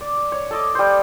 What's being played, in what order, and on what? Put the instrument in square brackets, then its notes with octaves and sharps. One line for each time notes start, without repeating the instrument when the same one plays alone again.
[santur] D5
C#5
A4 D#5 D6
G3 C5